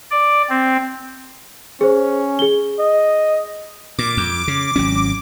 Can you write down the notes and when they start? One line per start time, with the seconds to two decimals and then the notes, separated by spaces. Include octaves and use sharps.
0.11 D5
0.50 C4
1.81 C#4 G#4 C5
2.39 G#4 G7
2.79 D#5
3.99 A#2 D6
4.17 F2
4.48 C#3
4.76 G#1 F#3 C#4